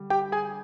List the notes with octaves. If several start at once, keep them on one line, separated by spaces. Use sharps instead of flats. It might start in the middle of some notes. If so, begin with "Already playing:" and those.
Already playing: D3 G3
G4 G5
G#4 G#5